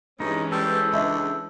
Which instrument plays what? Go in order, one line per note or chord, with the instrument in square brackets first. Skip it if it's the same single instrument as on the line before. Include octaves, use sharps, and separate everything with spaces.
[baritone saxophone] G2 [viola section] E3 G#3 C#4 [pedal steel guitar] D#4
[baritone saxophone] G3 [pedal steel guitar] A4 C5
[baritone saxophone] C#2 [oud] D4 D#5 E5